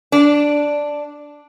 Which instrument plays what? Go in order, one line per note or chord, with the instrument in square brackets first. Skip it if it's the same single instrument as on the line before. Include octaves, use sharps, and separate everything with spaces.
[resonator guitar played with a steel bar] D4